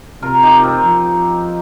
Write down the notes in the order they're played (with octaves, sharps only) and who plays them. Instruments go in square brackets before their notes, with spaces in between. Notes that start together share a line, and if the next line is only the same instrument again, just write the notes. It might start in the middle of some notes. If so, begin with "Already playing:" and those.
[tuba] C3 [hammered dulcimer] F4 A#4
[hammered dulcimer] D#4 G4
C4 F4
[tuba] F3